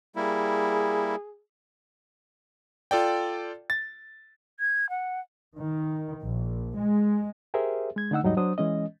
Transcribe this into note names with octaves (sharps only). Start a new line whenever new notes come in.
G3 A#3 E4 G#4
F4 A4 D5 G5
A6
G#6
F#5
D#3
A#1
G#3
G4 G#4 A#4 C5 E5
G#3 G#6
D3 A3 D#4 F#5 E6
D#2 G#2 F#3 G3 D#4 D#5
F#3 D4 C5 D#6
E3 G#3 C#4 D#5